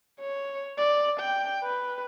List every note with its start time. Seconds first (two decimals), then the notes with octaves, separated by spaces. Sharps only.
0.21 C#5
0.78 D5
1.20 G5
1.63 B4